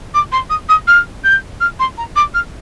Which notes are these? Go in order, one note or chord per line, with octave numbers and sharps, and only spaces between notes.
D6
C6
D#6
D#6
F6
G6
F6
C6
A#5
D6
F6